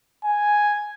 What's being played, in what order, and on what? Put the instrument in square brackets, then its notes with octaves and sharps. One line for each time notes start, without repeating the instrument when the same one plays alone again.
[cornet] G#5